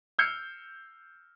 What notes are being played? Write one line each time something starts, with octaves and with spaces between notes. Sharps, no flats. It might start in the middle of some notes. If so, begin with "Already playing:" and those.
E6 F6 G6 C7 C#7